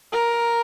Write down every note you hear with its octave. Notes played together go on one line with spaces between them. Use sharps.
A#4